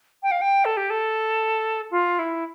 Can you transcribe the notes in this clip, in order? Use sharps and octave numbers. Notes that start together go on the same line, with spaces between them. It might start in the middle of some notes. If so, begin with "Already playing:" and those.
G5
F5
G5
A4
G4
A4
F4
E4